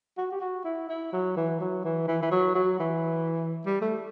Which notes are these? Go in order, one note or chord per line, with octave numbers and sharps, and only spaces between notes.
F#4
G4
F#4
E4
E4
F#3
E3
F#3
E3
E3
E3
F#3
F#3
E3
G3
A3